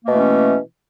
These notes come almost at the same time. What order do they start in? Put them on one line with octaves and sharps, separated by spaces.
A#3 B2 A3 E3 C#4